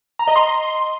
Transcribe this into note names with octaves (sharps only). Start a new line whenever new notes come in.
A#5
D#5
C6